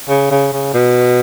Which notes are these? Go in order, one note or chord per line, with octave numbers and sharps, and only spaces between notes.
C#3
C#3
C#3
B2